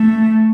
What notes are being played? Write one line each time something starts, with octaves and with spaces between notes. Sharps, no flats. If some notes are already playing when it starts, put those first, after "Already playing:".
Already playing: A3